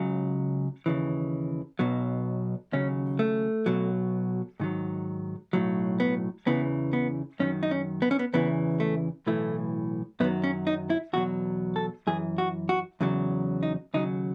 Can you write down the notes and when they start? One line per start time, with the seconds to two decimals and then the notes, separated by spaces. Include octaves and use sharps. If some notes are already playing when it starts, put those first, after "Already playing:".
Already playing: C#2 C#3 F#3
0.86 D#2 C#3 E3
1.79 B1 B2 F#3
2.72 D#2 C#3 F#3 C#4
3.19 A3
3.66 B1 B2 F#3
4.60 G#2 D#3 F#3
5.53 B1 A2 F#3
6.00 B3
6.46 E2 C#3 E3 B3
6.93 B3
7.39 F#2 D#3 F#3 C#4
7.63 D#4
7.71 C#4
8.02 B3
8.11 C#4
8.19 B3
8.33 E2 C#3 E3 B3
8.80 A3
9.27 B1 A2 E3 A3
10.20 F#2 D#3 F#3 B3
10.44 C#4
10.67 D#4
10.90 E4
11.13 E2 B2 F#3 F#4
11.76 A4
12.07 F#2 E3 G#4
12.38 F#4
12.69 F#4
13.01 E2 C#3 F#3
13.63 D#4
13.94 D#2 C#3 F#3 D#4